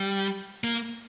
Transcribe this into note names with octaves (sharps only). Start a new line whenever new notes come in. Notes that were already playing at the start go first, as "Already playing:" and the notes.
Already playing: G3
A#3